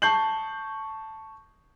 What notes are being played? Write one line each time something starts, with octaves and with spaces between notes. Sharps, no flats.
A5 C#6 G6 C7 F#7